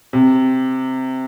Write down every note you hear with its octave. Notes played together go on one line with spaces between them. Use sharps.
C3